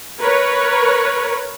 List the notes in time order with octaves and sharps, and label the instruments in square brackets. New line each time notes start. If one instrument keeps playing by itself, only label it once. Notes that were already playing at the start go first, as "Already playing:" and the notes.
[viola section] A#4 B4 C#5